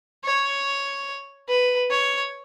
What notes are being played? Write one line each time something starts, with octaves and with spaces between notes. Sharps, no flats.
C#5
B4
C#5